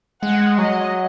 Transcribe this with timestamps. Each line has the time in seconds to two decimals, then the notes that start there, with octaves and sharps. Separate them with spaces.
0.22 G#3 F#5
0.58 F#3 D#5